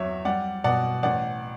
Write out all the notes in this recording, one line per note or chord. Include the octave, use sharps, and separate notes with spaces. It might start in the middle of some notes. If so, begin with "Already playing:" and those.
Already playing: E2 F#3 C#5 E5
G3 D5 F#5
B2 D5 F#5
A1 D5 F#5